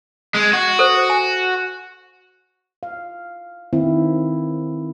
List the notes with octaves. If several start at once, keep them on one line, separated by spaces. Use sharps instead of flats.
G#3
F#4
A4 C5
G#5
F5
D#3 C4 E4